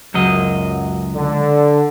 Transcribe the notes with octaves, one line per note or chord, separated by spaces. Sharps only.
C#2 F#2 F#3 D#5
D3